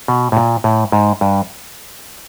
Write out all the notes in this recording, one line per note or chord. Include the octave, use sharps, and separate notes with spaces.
B2
A2
A#2
A2
G#2
G2